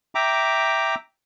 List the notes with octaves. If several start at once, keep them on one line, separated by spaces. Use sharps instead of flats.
E5 G5 A#5 D6